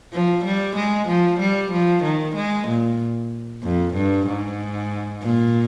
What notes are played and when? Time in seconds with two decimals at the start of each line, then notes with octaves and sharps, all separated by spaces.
0.13 F3
0.45 G3
0.76 G#3
1.08 F3
1.40 G3
1.71 F3
2.03 D#3
2.35 G#3
2.68 A#2
3.63 F2
3.94 G2
4.27 G#2
5.22 A#2